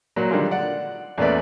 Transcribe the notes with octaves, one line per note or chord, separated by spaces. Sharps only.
A#2 F#3 A#3
D3 D#3 G3 G#3 F4
D5 F#5
E2 A#2 A3 C#4 B4 D5